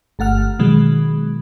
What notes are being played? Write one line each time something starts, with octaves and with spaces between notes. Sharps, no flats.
G1 A3 F#5 F6
B2 D#3 F#3 G#3